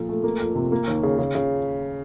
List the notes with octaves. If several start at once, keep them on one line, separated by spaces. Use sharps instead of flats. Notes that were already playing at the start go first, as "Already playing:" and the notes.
Already playing: A#2 F3 A4
A3
A#3
F2
C3
A#3
D#2
C#3
C#3
C#3